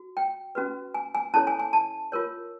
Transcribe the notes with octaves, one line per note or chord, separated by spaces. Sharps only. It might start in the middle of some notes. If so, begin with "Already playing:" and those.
Already playing: F#4
G5
C#4 F#4 B4
G#5
G#5
C#4 E4 A4 C#5 A5
G#5
G#5
A5
F4 A#4 C#5